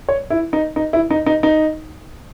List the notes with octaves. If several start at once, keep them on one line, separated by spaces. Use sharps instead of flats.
C#5
E4
D#4
D#4
E4
D#4
D#4
D#4